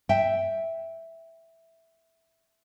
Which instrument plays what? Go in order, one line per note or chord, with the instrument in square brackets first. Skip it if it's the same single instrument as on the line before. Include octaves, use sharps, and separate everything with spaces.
[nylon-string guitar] E5 G5